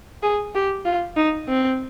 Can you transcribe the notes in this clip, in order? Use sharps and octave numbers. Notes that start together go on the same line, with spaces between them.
G#4
G4
F4
D#4
C4